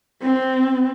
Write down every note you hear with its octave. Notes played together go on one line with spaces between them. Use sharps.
C4